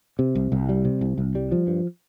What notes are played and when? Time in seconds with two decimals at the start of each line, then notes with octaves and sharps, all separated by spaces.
0.19 C3
0.35 C2
0.52 C2
0.69 G3
0.85 C3
1.01 C2
1.18 C2
1.35 G3
1.52 F3
1.67 G2